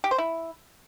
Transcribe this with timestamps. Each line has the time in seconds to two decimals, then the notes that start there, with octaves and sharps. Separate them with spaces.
0.04 G4
0.11 C5
0.18 E4